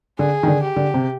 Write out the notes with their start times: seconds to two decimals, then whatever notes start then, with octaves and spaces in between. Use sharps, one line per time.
0.19 D3 G#4
0.43 D#3
0.47 D3
0.62 G4
0.76 D3
0.94 C3